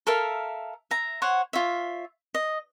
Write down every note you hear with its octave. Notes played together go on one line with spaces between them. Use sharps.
A4 A#4 E5 F5
E5 A#5
C5 C#5 F#5
F4 C#5 E5
D#5